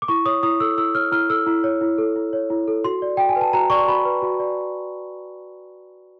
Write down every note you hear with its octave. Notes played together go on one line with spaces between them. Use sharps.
D6
E4 C#6
C#5 D#6
E4 D#6
A4 E6
E4 E6
C#5 F6
E4 F6
A4 E6
E4
C#5
E4
A4
E4
C#5
E4
A4
F#4 C6
D5
F#4 G5
G#5
B4
A5
F#4 A#5
D5 C#6
C6
F#4 B5
B4
F#4
D5